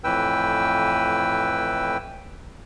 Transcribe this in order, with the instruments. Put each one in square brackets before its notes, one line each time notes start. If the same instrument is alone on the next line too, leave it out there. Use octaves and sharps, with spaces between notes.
[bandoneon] F2 A2 E3 B4 G5 E6